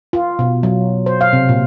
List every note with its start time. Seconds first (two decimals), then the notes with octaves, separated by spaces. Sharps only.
0.13 F4
0.39 B2
0.63 F#3
1.06 C5
1.21 F5
1.33 C3
1.49 A#2